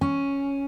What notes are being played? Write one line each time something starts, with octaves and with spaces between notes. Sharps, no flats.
C#4